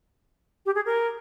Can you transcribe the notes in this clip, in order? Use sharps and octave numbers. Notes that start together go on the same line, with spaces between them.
G4
G#4
A#4